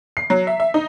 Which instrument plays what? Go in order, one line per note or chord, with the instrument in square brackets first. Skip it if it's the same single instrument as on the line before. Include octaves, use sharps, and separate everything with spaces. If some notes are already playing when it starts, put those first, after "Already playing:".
[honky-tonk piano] C7
F#3
E5
E5
D#4